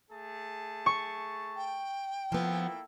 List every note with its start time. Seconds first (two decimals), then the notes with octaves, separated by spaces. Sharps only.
0.11 A3 G#4 A5
0.86 C#6
1.56 G5
2.32 F3 A#3 B3 E4 A4